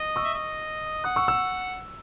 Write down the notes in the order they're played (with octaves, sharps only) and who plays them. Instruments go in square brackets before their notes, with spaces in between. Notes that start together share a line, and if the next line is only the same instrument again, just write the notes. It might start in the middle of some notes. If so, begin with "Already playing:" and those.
Already playing: [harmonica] D#5
[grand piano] C#6 E6
[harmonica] E5
D#5
[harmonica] F#5 [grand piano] D#6 F#6
[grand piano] C#6 E6
C#6 E6